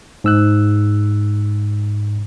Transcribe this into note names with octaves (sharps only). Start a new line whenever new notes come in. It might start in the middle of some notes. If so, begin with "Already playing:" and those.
G#2 E6 F#6